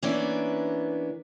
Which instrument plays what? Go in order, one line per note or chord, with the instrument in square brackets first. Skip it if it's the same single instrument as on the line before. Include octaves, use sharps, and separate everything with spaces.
[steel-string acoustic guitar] E3 A#3 B3 C#4 D4 B4